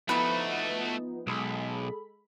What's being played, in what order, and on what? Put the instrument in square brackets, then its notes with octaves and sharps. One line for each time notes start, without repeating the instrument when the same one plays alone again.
[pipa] E3 B4 [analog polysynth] F3 B3 D#4 [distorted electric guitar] A3 F#4
[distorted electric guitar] B1 [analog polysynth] G#3 A4 B5